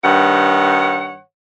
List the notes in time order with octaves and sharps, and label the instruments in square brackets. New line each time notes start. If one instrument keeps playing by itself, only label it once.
[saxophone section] G2 D#3 C#5 F#5